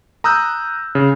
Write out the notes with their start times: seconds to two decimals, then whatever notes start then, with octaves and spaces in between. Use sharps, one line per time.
0.24 A#5 D#6 E6 F#6 G6
0.95 C#3